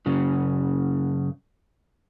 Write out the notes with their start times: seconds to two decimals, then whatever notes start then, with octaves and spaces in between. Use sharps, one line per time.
0.06 F#2 C#3